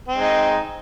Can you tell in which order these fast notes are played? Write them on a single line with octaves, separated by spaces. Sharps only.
C4 G#3 D#4